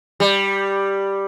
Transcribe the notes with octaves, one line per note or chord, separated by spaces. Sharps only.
G3